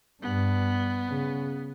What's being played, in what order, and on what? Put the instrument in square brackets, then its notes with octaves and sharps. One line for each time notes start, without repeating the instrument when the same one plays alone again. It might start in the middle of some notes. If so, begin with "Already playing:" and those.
[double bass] G2 [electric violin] B3
[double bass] C#3